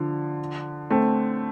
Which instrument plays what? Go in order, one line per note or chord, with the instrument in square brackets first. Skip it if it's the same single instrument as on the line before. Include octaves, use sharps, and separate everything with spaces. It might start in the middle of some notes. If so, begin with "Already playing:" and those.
Already playing: [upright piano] D3 F3
A3 C4